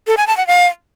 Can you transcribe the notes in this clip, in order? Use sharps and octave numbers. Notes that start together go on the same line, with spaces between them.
A4
G#5
A5
F#5
F5